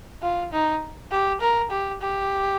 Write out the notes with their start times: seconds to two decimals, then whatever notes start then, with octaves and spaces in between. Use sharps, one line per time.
0.22 F4
0.52 D#4
1.11 G4
1.41 A#4
1.70 G4
2.01 G4